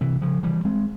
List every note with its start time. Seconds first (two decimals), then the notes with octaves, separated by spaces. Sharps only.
0.01 C3 E3
0.22 C#3 F3
0.43 E3 G3
0.65 G#3 C4